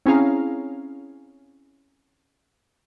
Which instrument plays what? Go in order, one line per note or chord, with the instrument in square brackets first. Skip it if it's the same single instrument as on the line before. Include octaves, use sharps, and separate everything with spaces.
[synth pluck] C4 C#4 E4 G#4 F5 A#5